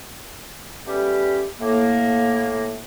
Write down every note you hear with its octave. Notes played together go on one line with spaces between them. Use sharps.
G3 A3 B3 C#4 G4
A2 A#3